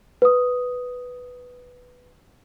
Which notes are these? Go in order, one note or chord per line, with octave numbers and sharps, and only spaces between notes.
B4 D#6